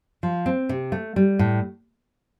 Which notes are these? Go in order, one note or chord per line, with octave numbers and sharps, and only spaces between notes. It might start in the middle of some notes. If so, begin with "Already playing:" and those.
F3
C4
C3
A3
G3
A2